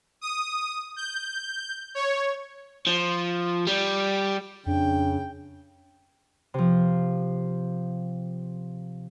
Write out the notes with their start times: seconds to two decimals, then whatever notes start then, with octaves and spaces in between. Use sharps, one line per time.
0.21 D#6
0.96 G6
1.95 C#5
2.87 F3
3.67 G3
4.66 F2 C#3 D4 G5
6.54 C3 F3